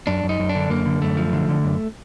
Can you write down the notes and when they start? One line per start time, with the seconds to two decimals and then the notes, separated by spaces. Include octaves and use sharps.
0.07 F#2 D4
0.23 F#2
0.29 D#4
0.40 F#2
0.49 D4
0.55 D3
0.70 F#2 A#3
0.86 D3
1.02 F#2 A3
1.17 F3
1.33 D3
1.49 D3
1.64 F#2